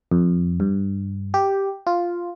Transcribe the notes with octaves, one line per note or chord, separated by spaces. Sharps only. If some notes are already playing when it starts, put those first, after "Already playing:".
F2
G2
G4
F4